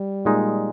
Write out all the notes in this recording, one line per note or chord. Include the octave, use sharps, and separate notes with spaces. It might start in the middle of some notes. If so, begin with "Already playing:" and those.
Already playing: G3
A#2 G#3 D#4